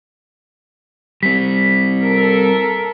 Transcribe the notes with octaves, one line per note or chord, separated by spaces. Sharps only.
G3 C4 B6
A4 A#4